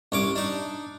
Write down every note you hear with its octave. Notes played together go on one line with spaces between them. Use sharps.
C2 C#4 D6
D4 D#4